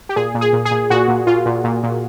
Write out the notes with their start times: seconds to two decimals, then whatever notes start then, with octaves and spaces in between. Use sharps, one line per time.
0.09 G4
0.16 A#2 G#4
0.35 A#2
0.41 G#4
0.53 A#2
0.65 G#4
0.71 A#2
0.90 A#2 F#4
1.08 A#2
1.27 A#2 F4
1.46 A#2
1.64 A#2
1.83 A#2